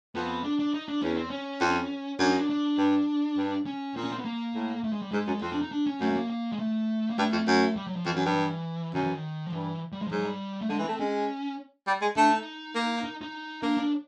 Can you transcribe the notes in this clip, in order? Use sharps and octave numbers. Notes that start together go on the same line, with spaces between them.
F2 B3
D4
D4
D#4
D4
E2 C#4
C4
C#4
F2
F#2 D4
D#4
D4
D4
G2
G2
C#4
A#2 C4
C#4
C4
B3
A#3
A2
A3
G#3
G3
G#2 G#3
F#2
F2 C4
D4
D#4
D4
C#4
F#2 A3
A3
A#3
A#3
G#3
A3
A#3
G2 A3
F2
F#2
G3
F#3
F3
F2 E3
F#2 E3
G2 F3
E3
F#2 D#3
E3
D#3
F3
G2 E3
G3
G#3
F3
G#2 F#3
G3
A3
D3 G#3
E3
A3 C4
G#3 C#4
G3
G#3
A3 D4
D#4
A#3
D#4
D#4
A#3 D4
D4